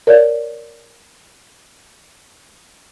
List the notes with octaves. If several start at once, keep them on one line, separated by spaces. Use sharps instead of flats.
A#4 C#5 D5